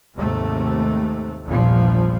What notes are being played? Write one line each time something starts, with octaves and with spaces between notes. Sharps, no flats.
D#2 G#2 C3 A3
F1 A#1 E2 G2 A#2 F3